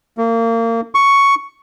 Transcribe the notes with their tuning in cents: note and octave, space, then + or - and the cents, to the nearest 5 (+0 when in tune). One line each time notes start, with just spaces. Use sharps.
A#3 -30
C#6 +5